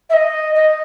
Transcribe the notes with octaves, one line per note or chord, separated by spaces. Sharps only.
E5
D#5
D#5